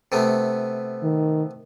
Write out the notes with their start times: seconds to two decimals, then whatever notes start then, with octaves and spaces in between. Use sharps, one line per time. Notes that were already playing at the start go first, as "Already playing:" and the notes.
0.12 C3 A3 B3
1.03 D#3